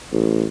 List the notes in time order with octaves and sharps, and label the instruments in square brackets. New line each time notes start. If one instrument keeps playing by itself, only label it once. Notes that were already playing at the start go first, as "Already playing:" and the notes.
[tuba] A1